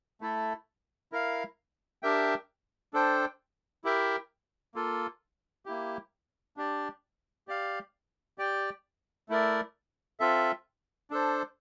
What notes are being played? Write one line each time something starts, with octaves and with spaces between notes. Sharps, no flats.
A3 E4 A4
E4 A#4 F5
D4 G4 A#4 E5 G5
D4 A4 C5 G5
E4 G4 A#4 E5 G5
A#3 F4 A4
A#3 E4 G4
D4 G4 D5
G4 D5 F5
G4 D5 G5
A3 E4 A#4 D5
C4 F4 A4 E5
D4 A4 C5